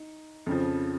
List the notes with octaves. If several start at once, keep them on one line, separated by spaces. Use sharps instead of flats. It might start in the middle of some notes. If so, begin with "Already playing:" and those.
Already playing: D#4
F2 C#3 F3